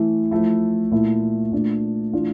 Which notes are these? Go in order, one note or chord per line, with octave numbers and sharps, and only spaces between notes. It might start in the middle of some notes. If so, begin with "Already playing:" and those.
Already playing: E3 A3 E4
F3 A3 E4
A#2 A3 E4
A#2 A3 D4
E3 A3 D4 F4